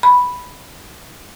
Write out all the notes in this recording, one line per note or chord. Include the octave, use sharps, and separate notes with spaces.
B5